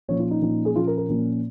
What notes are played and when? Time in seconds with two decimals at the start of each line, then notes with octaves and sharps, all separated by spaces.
0.08 A#2 F3 C#4 C#5
0.19 F4
0.31 D#4
0.42 A#2 F3 C#4
0.65 G#4
0.76 A#2 F3 A#3 C#4 F4
0.87 A#4
0.97 A#4
1.09 A#2 F3 A#3 C#4